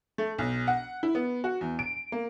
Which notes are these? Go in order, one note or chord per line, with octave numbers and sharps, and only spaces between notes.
A3
B1
F#5
E4
B3
F#4
E2
D7
A#3